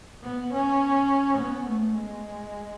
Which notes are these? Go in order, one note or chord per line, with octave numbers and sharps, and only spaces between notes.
B3
C#4
B3
A3
G#3